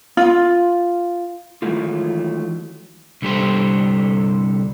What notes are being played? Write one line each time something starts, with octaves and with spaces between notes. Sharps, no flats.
F4
D#3 E3 F#3 G#3 A3 F4
C2 D3 G3 G4 A4 C5